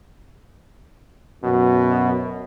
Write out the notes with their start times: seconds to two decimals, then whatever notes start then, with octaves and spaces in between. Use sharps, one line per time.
1.44 F#2 B2